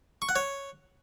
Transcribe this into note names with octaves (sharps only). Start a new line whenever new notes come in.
C#6
F#5
C#5